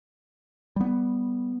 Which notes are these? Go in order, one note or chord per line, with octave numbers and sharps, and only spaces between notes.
G3 B3